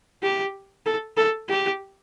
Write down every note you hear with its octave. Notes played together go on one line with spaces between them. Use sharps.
G4
A4
A4
G4